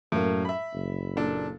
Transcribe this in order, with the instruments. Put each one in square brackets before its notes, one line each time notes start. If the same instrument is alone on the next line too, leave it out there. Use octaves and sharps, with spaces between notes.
[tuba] F#2 [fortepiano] A2 A#3
[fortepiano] E5 B5
[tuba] F#1
[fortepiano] A#2 D4 A4